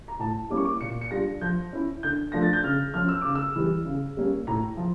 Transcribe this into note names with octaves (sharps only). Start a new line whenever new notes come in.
A#5
A2 A5
G3 A#3 C#4 E4 D6
C#6
D6
A#2 C#7
C#7
G3 D4 F4 A#6
F3 G6
C#4 E4
D3 G6
F3 A3 D4 F4 A#6
A6
G6
C#3 F6
F3 C#4 F6
E6
C#3 D6
E6
E3 G3
C#3
G3 A#3 C#4
A2 A#5
F3